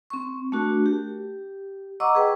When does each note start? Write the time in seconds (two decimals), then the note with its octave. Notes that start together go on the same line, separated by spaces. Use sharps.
0.10 C4 C#6
0.52 A3 D4 F#4 A#4
0.86 G4
2.00 D#5 F#5 A#5 C#6 D6 E6
2.15 G#4 B4 G5